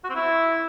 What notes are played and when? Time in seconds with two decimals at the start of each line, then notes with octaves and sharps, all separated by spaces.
0.04 F#4
0.09 C4
0.15 E4